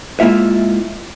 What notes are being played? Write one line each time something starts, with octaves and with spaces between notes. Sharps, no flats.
G#3 A#3 E4 F4 E5